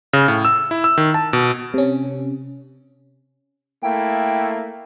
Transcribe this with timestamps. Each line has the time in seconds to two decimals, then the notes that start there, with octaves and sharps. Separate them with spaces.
0.13 C#3
0.28 A2
0.45 E6
0.71 E4
0.84 E6
0.98 D#3
1.14 A5
1.33 B2
1.74 C3 C#4
3.83 A3 A#3 E4 G5